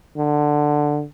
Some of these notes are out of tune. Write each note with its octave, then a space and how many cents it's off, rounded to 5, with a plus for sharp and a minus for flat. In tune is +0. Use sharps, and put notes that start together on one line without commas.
D3 +10